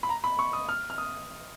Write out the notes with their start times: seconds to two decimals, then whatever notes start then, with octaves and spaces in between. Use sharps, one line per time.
0.03 B5
0.09 A#5
0.24 B5
0.39 C#6
0.53 D#6
0.69 F6
0.90 F6
0.98 D#6